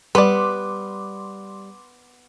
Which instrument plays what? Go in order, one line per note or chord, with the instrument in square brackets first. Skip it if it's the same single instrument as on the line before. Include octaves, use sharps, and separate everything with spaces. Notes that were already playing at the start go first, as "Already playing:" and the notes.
[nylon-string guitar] G3 [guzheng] B3 [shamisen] B4 D5 [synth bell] C6 D6